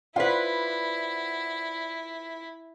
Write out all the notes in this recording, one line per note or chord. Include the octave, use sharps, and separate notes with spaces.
E4 F4 B4 C5 D5 F#5